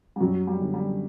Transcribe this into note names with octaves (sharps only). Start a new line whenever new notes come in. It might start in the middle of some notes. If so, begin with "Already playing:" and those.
G3
F#2 F#3
G3
D3
G3